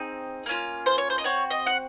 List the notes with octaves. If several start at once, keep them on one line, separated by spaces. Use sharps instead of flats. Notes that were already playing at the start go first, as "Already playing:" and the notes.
Already playing: C4 D#4 G#4
A#3 C#4 F4
C5
C#5
C5
D#5
C4 F#4 C#5
D#5
F#5